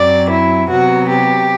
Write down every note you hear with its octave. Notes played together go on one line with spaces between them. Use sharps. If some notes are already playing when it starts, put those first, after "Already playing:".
Already playing: F#2 F#3 C4 D5
E4
C3 F#3 B3 F#4
G4